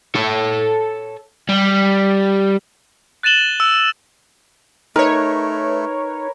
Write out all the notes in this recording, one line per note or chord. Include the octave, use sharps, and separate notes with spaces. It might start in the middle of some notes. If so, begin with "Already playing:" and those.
A4 C#5
G3
F#6 A6 D#7 E7 F#7 G7
E6
A3 D#4 A#4 B4 C#5